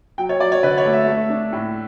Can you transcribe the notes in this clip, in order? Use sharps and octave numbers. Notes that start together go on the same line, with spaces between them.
F#3 G5
C#5
F#3 D5
C#5
D3 B4
C#5
A3
E5
A3
D4
A2